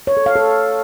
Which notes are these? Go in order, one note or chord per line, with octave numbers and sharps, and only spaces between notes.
C#5
A4
F5
A4